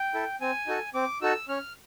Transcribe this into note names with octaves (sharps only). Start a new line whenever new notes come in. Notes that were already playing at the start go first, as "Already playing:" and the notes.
Already playing: G5
E4 A4
C4 G#5
D#4 F#4 A4
C4 D6
D#4 F#4 A4 E6
C#4 F6